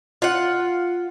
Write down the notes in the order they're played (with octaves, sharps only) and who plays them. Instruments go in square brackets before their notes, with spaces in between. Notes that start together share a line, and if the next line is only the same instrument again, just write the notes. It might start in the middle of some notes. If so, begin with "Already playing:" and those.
[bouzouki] F4 F#5